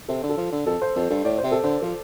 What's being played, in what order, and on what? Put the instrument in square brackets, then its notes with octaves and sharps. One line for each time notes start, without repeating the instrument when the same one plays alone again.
[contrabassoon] C3 [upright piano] A4
[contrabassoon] D3
[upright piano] A4
[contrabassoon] F3
D3
[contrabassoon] F2 [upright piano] A4
[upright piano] C5
[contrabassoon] F2 [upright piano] A4
[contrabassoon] G2 [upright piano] A4
[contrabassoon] A2 [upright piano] D5
[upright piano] C5
[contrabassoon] C3
[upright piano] A4
[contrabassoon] D3 [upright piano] C5
[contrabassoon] F3 [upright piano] A4